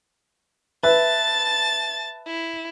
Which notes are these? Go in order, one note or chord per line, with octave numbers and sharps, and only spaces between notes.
B4 E5 A5 A6
E4